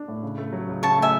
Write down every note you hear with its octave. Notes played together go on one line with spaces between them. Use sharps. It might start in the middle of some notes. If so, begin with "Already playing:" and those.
Already playing: D4
A2
C#3
A3
F#3
C#2
C#3 A5 C#6
A3 E5 G#5